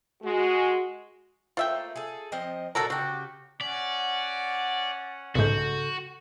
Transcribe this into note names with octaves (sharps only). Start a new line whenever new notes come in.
G#3 F#4
A3 A#3 F4 C5 E5 G5
G#4 A4
F3 C4 D#5
A#2 D3 F#3 F#4 A4 A#4
C#3 F#4 G4
C#4 D5 F#5
B1 G#2 C#3 F#4 A4 G6